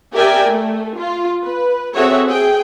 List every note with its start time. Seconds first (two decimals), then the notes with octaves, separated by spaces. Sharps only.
0.14 G4 A#4 D5 E5 G5 G#5
0.49 A3
0.97 F4
1.44 B4
1.95 C4 F#4 G#4 A4 C#5 E5
2.27 G#4 G5